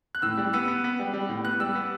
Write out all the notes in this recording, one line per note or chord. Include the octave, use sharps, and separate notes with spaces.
F#6
A2 E6
G3
B3 E6
B3
B3
G3
G3
A2
B3 F#6
G3 E6
B3